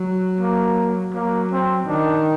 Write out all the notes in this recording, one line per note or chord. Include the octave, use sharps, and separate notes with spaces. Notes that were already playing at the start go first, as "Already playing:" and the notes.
Already playing: F#3
A#3
F#3 A#3
C4
D#3 D4